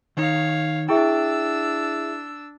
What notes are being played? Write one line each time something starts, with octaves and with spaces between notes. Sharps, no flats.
D#3 D#4 C#5 F5
D4 E4 G#4 E5 G5 E6